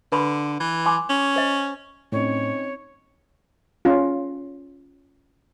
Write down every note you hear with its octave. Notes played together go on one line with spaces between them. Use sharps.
D3 B4 B5 C6
E3
G#5 C6 D6
C#4
C5 D#5
A2 C4 C#4 D#4 C#5
C#4 F4